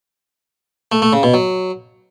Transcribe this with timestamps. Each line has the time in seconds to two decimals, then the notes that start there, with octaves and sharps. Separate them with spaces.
0.92 A3
1.02 A3
1.13 C#3
1.23 B2
1.34 F#3